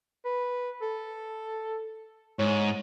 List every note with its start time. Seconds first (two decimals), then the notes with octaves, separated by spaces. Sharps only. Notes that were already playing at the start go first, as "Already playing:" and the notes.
0.25 B4
0.82 A4
2.39 G#2 C#5